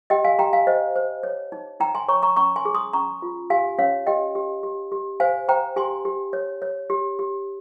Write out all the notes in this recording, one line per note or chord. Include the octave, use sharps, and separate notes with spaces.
G4 D#5 G5
F5 G#5
G4 G5 A#5
F5 G#5
C5 D#5
C5
C#5
D#4
D#4 G5 A#5
G#5 C6
C#5 A#5 C#6
A#5 C#6
C#4 A#5 C#6
G#5 C6
G#4
C6 D#6
C#4 A#5 C#6
F4
G4 F5 G#5
C#4 C#5 F5
G4 D#5 G5
G4
G4
G4
C5 F5 G#5
C5 G5 A#5
G4 G#5 C6
G4
C#5
C#5
G4
G4